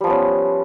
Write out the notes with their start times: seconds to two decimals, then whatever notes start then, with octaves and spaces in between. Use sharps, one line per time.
0.01 G3
0.04 F3
0.07 B3
0.10 C#4